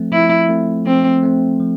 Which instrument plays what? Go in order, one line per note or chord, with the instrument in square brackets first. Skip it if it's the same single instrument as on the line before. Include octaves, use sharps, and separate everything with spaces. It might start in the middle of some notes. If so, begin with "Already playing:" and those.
Already playing: [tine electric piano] F3 A3 C4
[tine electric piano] F3 [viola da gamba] E4
[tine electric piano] A3 C4
[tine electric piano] F3 [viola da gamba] C4
[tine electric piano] A3 C4
F3